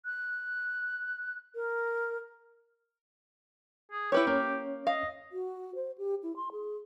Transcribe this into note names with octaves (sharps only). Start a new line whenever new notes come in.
F#6
A#4
G#4
E4 G4 B4 C#5
A#3 C#4 C#5
D#5 F5
F#4
C5
G4
E4
C6
G#4